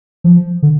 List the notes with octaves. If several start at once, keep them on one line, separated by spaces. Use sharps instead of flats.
F3
D3